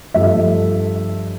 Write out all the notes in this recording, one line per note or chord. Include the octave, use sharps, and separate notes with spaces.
G2 F3 A3 E5